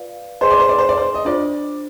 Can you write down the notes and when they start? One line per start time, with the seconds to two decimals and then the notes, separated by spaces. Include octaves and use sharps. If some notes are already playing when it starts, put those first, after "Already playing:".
Already playing: F4 B4 D5 F5
0.41 G#4 B4 C5 D#5 G#5 C6
0.50 D5
0.60 C5
0.69 D5
0.78 C5
0.89 D5
0.98 C5
1.14 D#5
1.25 D4 F4 C5 D5